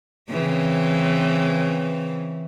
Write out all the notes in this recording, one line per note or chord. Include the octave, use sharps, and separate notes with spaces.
C#3 E3 C4